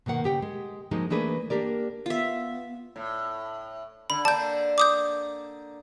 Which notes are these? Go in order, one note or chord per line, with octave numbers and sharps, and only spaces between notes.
B2 D#3 A#3 F#5
C#3 G4 G5
G#3
F3 G#3 A#3 D#4 F#4
E3 A3 A#3 D4 G#4 B4
A#3 D4 G4 A#4 D5
B3 F4 E5
A2
D3 B5
D3 A#3 D5 A5 G6
D6 D#6 G6